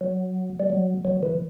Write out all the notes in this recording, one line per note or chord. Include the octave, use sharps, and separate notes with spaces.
F#3
G3
F#3
F#3
E3